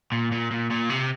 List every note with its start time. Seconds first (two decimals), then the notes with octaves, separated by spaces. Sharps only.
0.12 A#2
0.32 A#2
0.51 A#2
0.70 A#2
0.90 C3